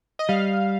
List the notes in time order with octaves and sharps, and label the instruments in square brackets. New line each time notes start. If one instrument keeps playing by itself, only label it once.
[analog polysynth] D#5
[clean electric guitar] G3 [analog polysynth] F5